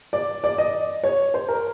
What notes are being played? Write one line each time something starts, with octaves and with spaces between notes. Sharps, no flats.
D5
D5
D#5
C#5
C5
A#4